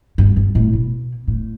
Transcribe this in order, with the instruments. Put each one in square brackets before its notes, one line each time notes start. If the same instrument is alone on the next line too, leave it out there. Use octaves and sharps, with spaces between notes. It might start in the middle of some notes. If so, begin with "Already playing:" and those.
[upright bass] G2
G2
A2
B2
A2